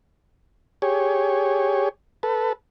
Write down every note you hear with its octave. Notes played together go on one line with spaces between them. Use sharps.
G4 G#4 C#5
A4 B4